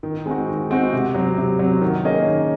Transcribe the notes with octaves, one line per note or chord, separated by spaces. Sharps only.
D#3
G#3 C4 D#4 F#4
D#3
G#3 C4 D#4 F#4
C3
F#3 C4
C3
F#3 C4
D#3
A#3 C#4 G#4 D#5
D#3